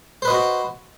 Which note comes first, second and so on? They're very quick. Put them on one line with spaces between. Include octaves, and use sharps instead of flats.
C5 B4 D#5 F#4